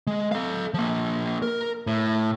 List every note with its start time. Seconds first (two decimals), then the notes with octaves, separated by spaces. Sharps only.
0.07 G#3
0.32 A4 F5
0.74 F3 A#3
1.42 A#4
1.87 A2